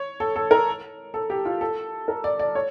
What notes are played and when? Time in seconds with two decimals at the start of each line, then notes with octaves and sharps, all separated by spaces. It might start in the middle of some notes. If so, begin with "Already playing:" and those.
Already playing: C#5
0.20 A4
0.36 A4
0.51 A#4
1.14 A4
1.30 G4
1.45 F4
1.61 A4
2.08 A#4
2.24 D5
2.39 D5
2.55 C#5